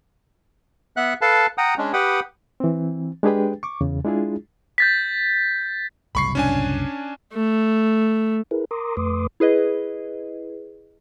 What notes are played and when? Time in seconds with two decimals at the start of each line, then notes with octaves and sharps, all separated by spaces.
0.97 B3 E5 F#5 F#6
1.21 A4 B4 F5 A5
1.58 F#5 G5 A#5 D#6
1.78 G#3 C#4 D4
1.93 G4 B4 F#5 G5 B5 D#6
2.60 E3 C4
3.23 G#3 D4 G4 G#4 B4 G5
3.63 C#6 D6
3.81 E2 C#3
4.05 G#3 D4 E4 F4 G#4
4.78 G6 A6 B6
6.15 F#1 C2 A2 B5 C#6 C7
6.35 C#4 D4 G#5
7.34 A3
8.51 E4 G#4 A#4 B4
8.71 A#4 A#5 C6 D6 D#6
8.97 F2 A3 B4 C6 D6 D#6
9.40 E4 G#4 B4 D#5